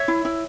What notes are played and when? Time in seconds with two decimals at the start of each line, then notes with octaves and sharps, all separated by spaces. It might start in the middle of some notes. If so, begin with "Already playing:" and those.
Already playing: C#5 E5
0.08 E4
0.25 E4